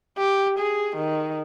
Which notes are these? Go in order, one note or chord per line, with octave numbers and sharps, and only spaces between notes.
G4
G#4
D#3